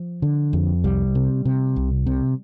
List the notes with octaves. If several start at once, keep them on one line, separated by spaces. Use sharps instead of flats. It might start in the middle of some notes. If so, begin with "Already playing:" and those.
Already playing: F3
D3
F2
C2 G3
C3
C3
C2
C3